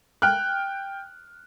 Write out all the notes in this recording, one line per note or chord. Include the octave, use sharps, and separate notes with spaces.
G5 F6 F#6